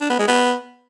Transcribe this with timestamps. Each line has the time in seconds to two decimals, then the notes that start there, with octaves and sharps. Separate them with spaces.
0.01 D4
0.10 B3
0.19 G#3
0.28 B3